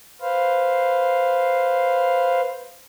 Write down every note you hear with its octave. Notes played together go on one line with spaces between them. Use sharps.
B4 C5 F5